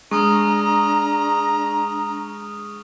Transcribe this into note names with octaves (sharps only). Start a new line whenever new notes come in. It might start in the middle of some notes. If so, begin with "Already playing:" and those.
G#3 D4 A#5 C#6 D#6 F6